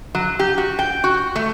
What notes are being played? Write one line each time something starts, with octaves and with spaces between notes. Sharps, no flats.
F#3
G4
F#4
G5
F#4
A3